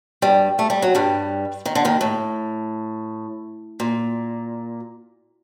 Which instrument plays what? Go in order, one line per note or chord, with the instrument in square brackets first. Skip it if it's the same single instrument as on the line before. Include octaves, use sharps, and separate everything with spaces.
[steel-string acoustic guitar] G2 G3
A3
G3
F#3
G2 G3
D#3
D3
D#2 D#3
A2
A#2